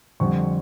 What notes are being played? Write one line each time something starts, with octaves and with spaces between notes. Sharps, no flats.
F2 D3 G3 C4 C#6